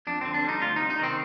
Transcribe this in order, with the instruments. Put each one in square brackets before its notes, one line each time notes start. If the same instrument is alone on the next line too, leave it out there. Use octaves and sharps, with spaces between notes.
[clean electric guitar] F2 D4
D3 C4
D4
G3 D#4
D2 F4
C3 D#4
D#4
D#3 C4